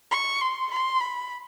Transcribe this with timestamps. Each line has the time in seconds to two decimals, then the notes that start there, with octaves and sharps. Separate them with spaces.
0.11 C#6
0.41 C6
0.71 C6
1.00 B5